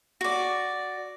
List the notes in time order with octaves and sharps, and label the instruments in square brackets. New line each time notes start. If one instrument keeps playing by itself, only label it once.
[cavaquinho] F#4 D5